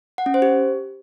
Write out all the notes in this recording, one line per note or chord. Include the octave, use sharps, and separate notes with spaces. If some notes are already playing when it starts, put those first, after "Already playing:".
F#5
C#4
C5
G4